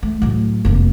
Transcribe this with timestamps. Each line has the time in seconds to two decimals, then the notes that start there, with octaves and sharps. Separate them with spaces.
0.03 A3
0.22 A2 F#3
0.65 F1 A#3